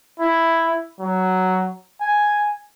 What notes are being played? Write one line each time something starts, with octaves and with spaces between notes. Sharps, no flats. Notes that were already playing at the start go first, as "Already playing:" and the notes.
E4
F#3
G#5